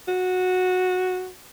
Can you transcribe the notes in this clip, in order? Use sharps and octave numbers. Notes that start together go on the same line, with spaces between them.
F#4